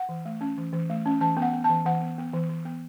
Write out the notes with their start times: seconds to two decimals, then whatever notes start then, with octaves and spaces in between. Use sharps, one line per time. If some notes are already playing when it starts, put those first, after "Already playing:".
Already playing: F#5
0.09 E3
0.25 A3
0.41 C#4
0.57 E3
0.73 E3
0.90 A3
1.05 C#4
1.21 E3 A5
1.37 B3
1.42 F#5
1.53 B3
1.64 A5
1.69 E3
1.86 E3 F#5
2.01 B3
2.18 B3
2.33 E3
2.49 E3
2.65 B3